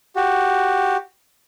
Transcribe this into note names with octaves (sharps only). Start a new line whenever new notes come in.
F#4 G4